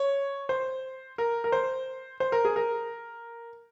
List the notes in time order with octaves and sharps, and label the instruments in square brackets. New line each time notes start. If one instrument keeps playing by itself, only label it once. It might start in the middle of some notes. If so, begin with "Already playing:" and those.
Already playing: [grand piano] C#5
C5
A#4
A#4
C5
C5
A#4
G#4
A#4